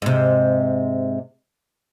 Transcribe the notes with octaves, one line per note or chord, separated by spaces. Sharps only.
G#2 C3